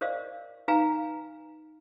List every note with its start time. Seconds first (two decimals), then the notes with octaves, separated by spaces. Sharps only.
0.01 A#4 C5 D5 D#5 F5
0.68 D#4 B4 F5 G#5 A#5